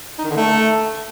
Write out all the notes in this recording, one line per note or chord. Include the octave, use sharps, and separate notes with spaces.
D#4
D#3
D3
A3